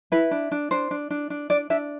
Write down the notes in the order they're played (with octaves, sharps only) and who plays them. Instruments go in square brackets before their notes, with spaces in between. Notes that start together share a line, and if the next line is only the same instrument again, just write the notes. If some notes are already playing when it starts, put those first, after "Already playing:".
[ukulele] E4 B4
D4
D4
D4 C5
D4
D4
D4
D4 D5
D4 E5